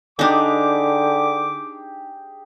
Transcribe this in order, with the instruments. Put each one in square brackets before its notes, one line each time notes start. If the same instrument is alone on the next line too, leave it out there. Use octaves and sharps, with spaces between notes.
[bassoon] D3 [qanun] D4 D#4 [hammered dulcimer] G4 G#4 [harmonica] D6